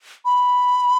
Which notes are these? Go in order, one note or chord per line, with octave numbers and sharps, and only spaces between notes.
B5